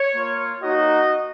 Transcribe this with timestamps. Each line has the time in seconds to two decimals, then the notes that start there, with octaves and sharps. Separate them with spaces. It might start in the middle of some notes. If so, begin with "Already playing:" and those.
Already playing: C#5
0.15 A#3 F4
0.62 A#3 D#4 F#4 D#5